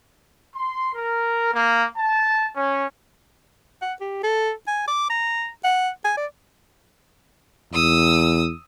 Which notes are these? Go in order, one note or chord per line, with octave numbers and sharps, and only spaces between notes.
C6
A#4
A#3
A5
C#4
F#5
G4
A4
G#5
D6
A#5
F#5
G#5
D5
E2 D#6 E6